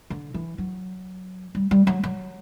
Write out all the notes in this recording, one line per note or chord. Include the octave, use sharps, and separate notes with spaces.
D3
E3
F#3
G3
G3
F#3
F#3